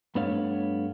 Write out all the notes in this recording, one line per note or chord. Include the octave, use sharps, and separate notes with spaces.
G2 A3 B3 D4 C#5 F5